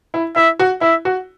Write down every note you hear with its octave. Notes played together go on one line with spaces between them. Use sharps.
E4
E4 E5
F#4
E4 E5
F#4